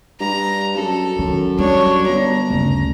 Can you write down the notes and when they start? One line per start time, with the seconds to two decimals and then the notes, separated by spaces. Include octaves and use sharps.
0.20 G2 A#5
0.77 F#2 A4
1.19 F#2 D#3
1.59 G3 D4 C#5
2.07 G1 A#5
2.50 F#1 D2